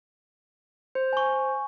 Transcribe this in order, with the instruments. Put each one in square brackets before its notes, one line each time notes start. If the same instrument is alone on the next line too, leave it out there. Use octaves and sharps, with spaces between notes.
[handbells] C5
[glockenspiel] G#5 C#6